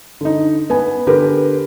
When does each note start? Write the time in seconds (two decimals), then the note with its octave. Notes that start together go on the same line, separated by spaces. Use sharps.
0.21 D3 D#4
0.70 B3 G#5
1.07 D3 G4 A#4 B4